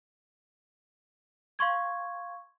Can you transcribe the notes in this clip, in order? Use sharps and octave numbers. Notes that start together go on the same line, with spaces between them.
F5 C6 C#6 G#6